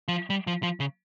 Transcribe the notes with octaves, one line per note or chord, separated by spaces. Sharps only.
F3
G3
F3
F3
C#3